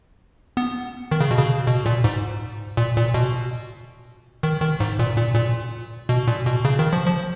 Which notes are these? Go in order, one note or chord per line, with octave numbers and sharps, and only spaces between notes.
B3
D#3
C#3
B2
C#3
B2
A#2
G#2
A#2
A#2
B2
D#3
D#3
G#2
A#2
A#2
A#2
B2
A#2
B2
C#3
D#3
F3
F3